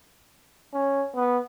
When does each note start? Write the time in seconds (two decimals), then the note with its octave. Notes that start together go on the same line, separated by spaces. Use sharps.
0.74 C#4
1.15 B3